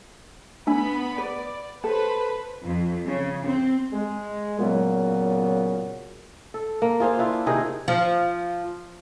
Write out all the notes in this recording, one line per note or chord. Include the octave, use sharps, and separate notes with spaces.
A3 B3 D4 G#5 B5
B4 D5
A4 B4 C5 B5
F2
C#3
C4
G#3
A#2 C#3 F#3 B3 F#4
A4
A#3
F4 G#4 C5 F5
D4 E4 F4
C3 D#3 D#4 G#4
F3